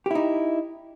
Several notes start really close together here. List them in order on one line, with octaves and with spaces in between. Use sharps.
G4 E4 D#4